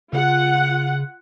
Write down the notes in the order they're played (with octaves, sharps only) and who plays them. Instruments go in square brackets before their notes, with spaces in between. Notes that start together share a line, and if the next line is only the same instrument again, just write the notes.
[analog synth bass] C#3 [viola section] F4 F#5